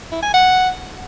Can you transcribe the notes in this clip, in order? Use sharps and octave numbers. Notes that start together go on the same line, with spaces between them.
E4
G#5
F#5